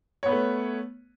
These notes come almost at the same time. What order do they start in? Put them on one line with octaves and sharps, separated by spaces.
C#5 B3 B4 A3